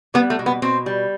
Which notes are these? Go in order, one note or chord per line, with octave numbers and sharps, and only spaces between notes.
G3 B3
A3
B2
B3
B2 C4
G3